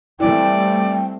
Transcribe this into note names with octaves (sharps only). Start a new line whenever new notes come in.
E3 G3 A3 C4 D5 G5